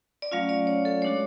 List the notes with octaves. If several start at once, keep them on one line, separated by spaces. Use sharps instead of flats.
D5
F#3 A3 C#4 F4 F5
D5
C#5
A4
G#3 D4 F#4 C#5